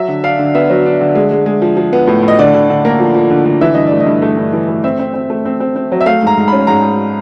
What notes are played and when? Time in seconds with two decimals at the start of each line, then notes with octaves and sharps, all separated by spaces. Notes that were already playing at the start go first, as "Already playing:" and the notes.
Already playing: F#3 E5
0.08 D3
0.24 D4 F5
0.39 D3
0.55 B3 E5
0.70 F#3
0.86 D4
1.01 D3
1.15 G#3
1.31 G#3
1.46 G#3
1.62 F3
1.77 F3
1.93 B3
2.07 A2
2.23 A2 D#5
2.39 D3 D5
2.54 D3
2.70 D3
2.85 A#3
3.00 F3
3.15 F3
3.30 D3
3.45 D3
3.61 E3 E5
3.74 G2 D#5
3.87 D5
3.92 A3
4.00 D#5
4.07 G2
4.22 A3
4.37 G2
4.53 E3
4.69 A3
4.84 C4 E5
4.99 C4
5.14 C4
5.30 A3
5.45 C4
5.60 C4
5.76 C4
5.92 F#3
6.01 E5
6.06 A3 F5
6.22 G#2 A#5
6.37 G#2
6.48 C#4 B5
6.67 G#2 A#5
6.83 G#2